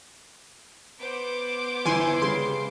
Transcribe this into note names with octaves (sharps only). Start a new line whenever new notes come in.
B3 C5 D6
G1 E4 G#5 C6 C#7
C#3 G3 G#3 C6